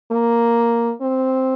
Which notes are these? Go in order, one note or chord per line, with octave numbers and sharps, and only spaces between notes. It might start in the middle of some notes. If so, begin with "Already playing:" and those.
A#3
C4